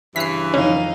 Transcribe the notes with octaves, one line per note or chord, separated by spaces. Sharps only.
G2 C#3 E3 B6 C7
F2 D#3 C#4 D#4 F5